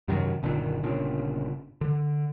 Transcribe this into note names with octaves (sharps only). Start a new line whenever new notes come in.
F#2 C3 D#3 F#3
F#1 A#2 D3 D#3
G1 A#2 C#3 D4
D3